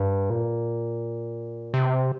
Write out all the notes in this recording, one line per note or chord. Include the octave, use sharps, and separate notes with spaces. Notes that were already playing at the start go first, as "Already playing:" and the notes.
Already playing: G2
A#2
C3